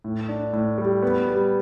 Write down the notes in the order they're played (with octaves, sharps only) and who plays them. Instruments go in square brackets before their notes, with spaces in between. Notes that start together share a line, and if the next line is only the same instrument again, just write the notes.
[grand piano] A2
D4
A2
G3
B3
G3